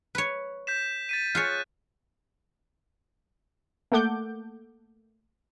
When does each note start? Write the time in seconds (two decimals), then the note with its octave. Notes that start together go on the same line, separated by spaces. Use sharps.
0.15 B4 C#5
0.67 G6 B6 E7
1.09 A6 B6 D#7
1.35 F4 G#4 C#5 F#6
3.92 A3 A#3 A4 F#5 D6 G6